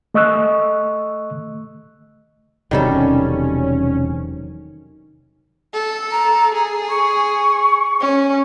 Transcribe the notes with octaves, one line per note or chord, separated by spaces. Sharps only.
A3 D#5 C#6 E6 F#6
E1 C3 D#3 F#3 G3 C#4 A4
A4
A#5
G#4
C#6
C#4